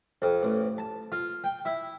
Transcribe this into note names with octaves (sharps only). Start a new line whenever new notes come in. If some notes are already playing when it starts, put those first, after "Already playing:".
F2
A1
A5
F4
G5
E4